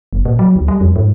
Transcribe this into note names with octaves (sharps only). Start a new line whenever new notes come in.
F#1
A#2
F#3
D2
G3
F2
G#2